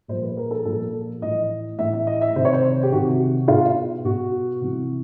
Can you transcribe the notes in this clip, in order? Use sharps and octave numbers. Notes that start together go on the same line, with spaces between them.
A#2 F3 C5
B4
A#4
A4
A#2 F3 A4
A2 E3 D#5
A2 E3 E5
E5
D#5
E5
C3 D#3 C5
C#5
C5
G4
C3 D#3 F#4
B2 F4
B2 F#4
C3 E3